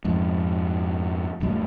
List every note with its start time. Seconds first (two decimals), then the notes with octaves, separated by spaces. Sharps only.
0.05 F2 G#2
1.40 D#1 G2 F#3 A3